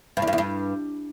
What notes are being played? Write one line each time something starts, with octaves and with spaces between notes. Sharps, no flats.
G2
E2
G2
E2
G2